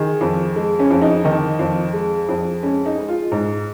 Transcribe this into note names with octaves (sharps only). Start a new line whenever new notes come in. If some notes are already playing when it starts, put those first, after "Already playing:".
Already playing: D#3 G#4
F2
G#3
C#4
F2
D#4
D#3 D#4
F2
G#3
F2
G#3 C#4
D#4
G#3
F4
G#2